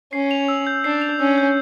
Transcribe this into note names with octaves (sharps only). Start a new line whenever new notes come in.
C#4 C7
F7
E6
G6
D4 C7
F7
C#4 E6
G6